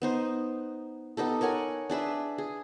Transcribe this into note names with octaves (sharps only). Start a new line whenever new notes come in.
B3 D#4 C5
B3 D#4 G4 A4
A#4 C#5 F#5 G#5
D4 G#4 B4 E5
G#4